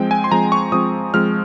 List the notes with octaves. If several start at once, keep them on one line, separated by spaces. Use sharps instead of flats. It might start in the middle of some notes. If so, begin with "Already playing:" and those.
Already playing: F3 G#3 C4 G5
G#5
C6
F3 G#3 C4 A#5
C#6
F3 G#3 C4 D#6
F3 G#3 C4 F6